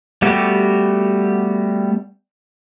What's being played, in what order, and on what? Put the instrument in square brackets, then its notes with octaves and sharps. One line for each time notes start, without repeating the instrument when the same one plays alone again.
[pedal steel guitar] G3 A3 B3 F#4 G4